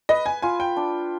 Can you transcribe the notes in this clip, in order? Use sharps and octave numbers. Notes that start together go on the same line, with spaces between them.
B4 D#5
G#5
F4 G#5
G5
D4